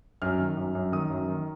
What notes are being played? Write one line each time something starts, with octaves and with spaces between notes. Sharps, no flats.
F#2 F6
D#3
F#2
F#2
D#3 D#6
F#2
D#3